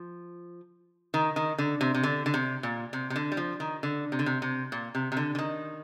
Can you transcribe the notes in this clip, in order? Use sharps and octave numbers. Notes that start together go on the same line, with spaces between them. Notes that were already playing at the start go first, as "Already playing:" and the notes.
Already playing: F3
D#3
D#3
D3
C3
C3
D3
D3
C3
A#2
C3
C3
D3
G3
F3
D#3
D3
C3
D3
C3
C3
A#2
C3
C3
D3
D3
D#3